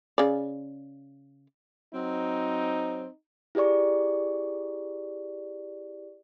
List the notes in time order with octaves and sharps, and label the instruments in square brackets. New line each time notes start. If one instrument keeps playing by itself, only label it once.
[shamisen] C#3 D5
[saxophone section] F#3 C4 [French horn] D#4
[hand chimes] E4 G4 G#4 D5 C#6